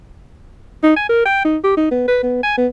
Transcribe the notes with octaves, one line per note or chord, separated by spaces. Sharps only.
D#4
G#5
A#4
G5
D#4
G4
D#4
B3
B4
B3
G#5
B3